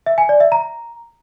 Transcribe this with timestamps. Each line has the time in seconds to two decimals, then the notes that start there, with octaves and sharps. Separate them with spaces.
0.06 E5
0.18 G#5
0.29 D5
0.40 E5
0.52 A#5